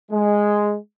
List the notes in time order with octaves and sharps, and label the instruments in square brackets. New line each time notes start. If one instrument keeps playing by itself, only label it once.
[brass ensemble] G#3